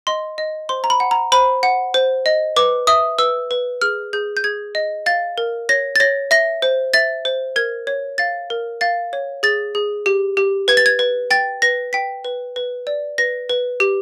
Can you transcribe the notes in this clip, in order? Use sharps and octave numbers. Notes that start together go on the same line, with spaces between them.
D#5 C6
D#5
C5 C6
A#5
B5
F#5
A#5
C5 B5
F#5
C5
D#5
B4 D6
E5 D#6
B4 E6
B4
G#4 F6
G#4 G6
G6
G#4 G#6
D#5
F5 A6
A#4
C#5 A#6
A6
C#5 A#6
E5 A#6
C5
E5 A6
C5
A#4 G#6
C#5
F5 A6
A#4
F5 A6
C#5
G#4 A6
G#4
G4
G4
B4 G#6
A6
G#6
B4
G5 A6
B4 A#6
G5 B6
B4
B4
D5
B4 A#6
B4
G4